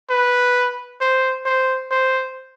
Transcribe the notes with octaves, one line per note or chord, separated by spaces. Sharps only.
B4
C5
C5
C5